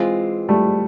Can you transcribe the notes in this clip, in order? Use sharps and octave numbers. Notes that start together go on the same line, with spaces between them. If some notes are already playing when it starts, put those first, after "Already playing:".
Already playing: E3 G#3 C4 F4
G3 A3